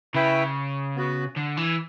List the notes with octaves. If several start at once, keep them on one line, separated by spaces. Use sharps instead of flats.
C#3 E4 B4 E5 G5
B3 F#4 B4
D3
E3